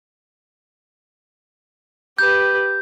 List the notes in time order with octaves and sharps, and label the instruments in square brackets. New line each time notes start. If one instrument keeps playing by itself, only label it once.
[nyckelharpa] G4 B4 [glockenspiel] G6